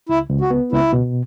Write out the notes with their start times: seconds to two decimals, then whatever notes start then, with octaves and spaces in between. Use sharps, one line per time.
0.09 C#2 E4
0.30 C#2
0.41 F#4
0.51 B3
0.72 C#2 E4
0.93 B2